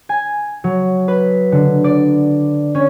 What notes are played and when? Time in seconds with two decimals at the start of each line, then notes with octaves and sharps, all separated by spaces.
0.09 G#5
0.64 F#3
1.08 B4
1.52 D3
1.84 D5
2.75 C#4